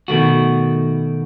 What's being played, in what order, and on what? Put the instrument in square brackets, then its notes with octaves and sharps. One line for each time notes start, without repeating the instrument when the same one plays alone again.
[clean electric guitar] B2 D#3 A3 F#4